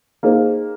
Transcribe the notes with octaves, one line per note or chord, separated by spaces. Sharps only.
A#3 D#4 G#4 C5